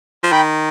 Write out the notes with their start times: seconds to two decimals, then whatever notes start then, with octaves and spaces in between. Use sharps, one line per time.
0.23 F3
0.32 D#3 G5 B5